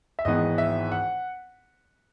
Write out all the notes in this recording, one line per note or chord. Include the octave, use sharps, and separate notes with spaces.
E5
G#1 G#2 E3 B3 D#5
E5
F#5